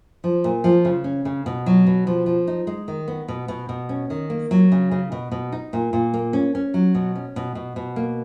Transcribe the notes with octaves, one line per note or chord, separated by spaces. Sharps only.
F3
A#2
F3
C#3
C#4
C#3
B2
F#3
B2
F3
F3
D#4
G#3
D#3
B3
B2
B2
B2
C#4
D#3
A#3
F#3
C#3
C#3
B2
B2
D#4
A#2
A#2
A#3
C#4
C#4
F#3
B2
C#4
B2
B2
B2
A#3